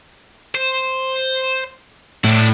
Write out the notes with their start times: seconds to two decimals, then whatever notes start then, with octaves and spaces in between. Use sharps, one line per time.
0.55 C5
2.24 A2 D4 E4